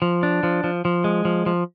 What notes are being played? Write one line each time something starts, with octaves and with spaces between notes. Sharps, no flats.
F3
D4
F3
F3
F3
G#3
F3
F3